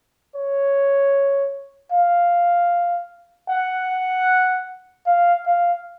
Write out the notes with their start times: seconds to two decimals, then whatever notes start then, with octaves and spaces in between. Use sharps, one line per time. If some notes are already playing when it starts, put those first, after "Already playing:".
0.36 C#5
1.92 F5
3.50 F#5
5.06 F5
5.45 F5